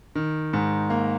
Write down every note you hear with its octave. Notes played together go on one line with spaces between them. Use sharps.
D#3
G#2
A#3